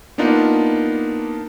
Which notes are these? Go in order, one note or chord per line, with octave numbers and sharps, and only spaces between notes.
A#3 B3 D4 D#4 F4